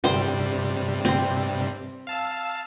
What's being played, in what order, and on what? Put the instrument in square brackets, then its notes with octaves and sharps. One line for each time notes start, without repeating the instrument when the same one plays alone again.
[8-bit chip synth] G2 C3 G3 [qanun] C5 G5
[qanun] C4 C6
[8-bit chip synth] F5 A5 E6